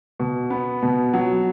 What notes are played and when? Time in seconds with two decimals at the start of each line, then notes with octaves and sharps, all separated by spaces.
0.19 B2
0.50 B3
0.83 B2
1.13 F#3